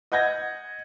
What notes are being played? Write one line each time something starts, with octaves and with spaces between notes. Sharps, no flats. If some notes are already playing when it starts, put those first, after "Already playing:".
D#5 F#5 G6 G#6 A#6